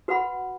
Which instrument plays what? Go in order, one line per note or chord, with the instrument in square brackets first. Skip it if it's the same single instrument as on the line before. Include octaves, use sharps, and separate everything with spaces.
[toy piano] F#4 B4 F#5 B5